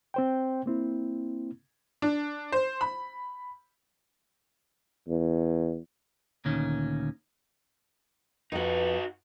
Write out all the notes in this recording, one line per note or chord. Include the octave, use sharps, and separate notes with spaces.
C4 C5 G5
A#3 C4 E4
D4
C5
B5
E2
D2 A#2 D#3 C#4
F2 D#4 F#4 B4